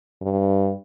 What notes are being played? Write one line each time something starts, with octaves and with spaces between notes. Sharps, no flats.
G2